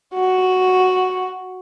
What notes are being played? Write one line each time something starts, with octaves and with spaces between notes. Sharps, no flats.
F#4